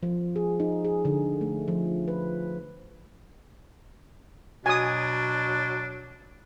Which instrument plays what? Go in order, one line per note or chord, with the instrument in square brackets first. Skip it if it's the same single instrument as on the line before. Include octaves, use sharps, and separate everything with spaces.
[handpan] F3
G#4
D#4
G#4
D3
A3
F3
B4
[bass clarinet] B2 [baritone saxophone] F#3 [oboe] D4 [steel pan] G#5 D#6